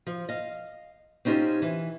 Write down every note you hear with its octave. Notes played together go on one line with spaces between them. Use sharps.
F3
D#5 F5
C4 C#4 D#4 F4 G4 C5
E3